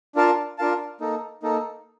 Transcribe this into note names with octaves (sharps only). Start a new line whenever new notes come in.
D4 F4 A#4 F5 A5
D4 F4 A#4 F5 A5
A#3 D#4 A4
A#3 D#4 A4